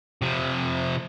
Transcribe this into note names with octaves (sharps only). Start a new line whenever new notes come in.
C3 F3